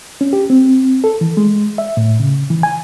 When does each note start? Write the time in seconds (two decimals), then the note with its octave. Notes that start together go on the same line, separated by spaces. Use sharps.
0.21 C#4
0.33 G4
0.50 C4
1.04 A4
1.21 E3
1.37 G#3
1.78 E5
1.97 A2
2.20 C#3
2.51 E3
2.63 G#5